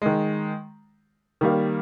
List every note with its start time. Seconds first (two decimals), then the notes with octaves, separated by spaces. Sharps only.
0.02 D#3 G#3
1.41 D#3 G3 A#3